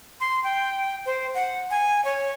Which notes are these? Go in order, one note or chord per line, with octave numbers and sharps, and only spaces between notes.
C6
G5
C5
F#5
G#5
C#5